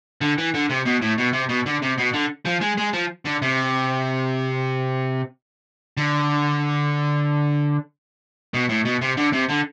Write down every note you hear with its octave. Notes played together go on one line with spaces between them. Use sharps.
D3
E3
D3
C3
B2
A2
B2
C3
B2
D3
C3
B2
D3
F3
G#3
G#3
F3
D3
C3
D3
B2
A2
B2
C3
D3
C3
D3